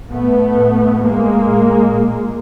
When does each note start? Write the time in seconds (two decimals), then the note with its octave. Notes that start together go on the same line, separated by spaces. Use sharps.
0.11 A2 A3 B3
0.56 A2
1.00 A2 G#3 A#3
1.45 A2
1.89 A#2